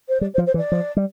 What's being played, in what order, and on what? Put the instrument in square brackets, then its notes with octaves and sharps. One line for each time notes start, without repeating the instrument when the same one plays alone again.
[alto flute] C5
[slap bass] G3 [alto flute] D5
[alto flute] C5
[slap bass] F3
[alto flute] C5
[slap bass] E3
[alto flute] D5
[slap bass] F3
G3